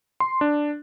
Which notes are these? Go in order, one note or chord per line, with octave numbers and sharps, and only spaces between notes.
C6
D4